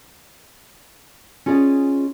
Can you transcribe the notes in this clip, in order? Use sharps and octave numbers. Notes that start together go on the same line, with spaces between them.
C#4 F4 G#4 D5 D#5